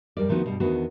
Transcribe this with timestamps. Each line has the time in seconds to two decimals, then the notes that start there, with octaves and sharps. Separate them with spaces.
0.17 F2 G3 A#4 D5
0.29 D2 D#3 F3 B3 F#4
0.44 G2 B2 G3
0.60 E2 D#3 B3 D4 F#4